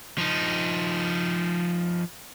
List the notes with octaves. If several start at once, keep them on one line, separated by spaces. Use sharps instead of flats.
F3 D#4